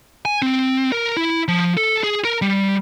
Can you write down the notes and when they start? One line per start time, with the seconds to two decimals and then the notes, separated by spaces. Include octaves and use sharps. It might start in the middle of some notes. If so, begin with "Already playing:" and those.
0.25 G#5
0.42 C4
0.92 A#4
1.17 E4
1.48 F3
1.77 A4
2.03 G#4
2.25 A#4
2.42 G3